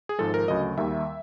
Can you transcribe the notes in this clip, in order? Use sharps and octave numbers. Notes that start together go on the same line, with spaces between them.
G#4
G#1 G#2 F3 G#3 A4
A#4
D2 C#3 F#3 D#5
D#2 D#3 G3 E5